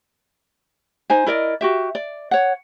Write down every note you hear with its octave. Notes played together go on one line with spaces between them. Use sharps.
D#4 C5 G#5
E4 A#4 D5 D#5
F#4 G4 E5
D5
C#5 F#5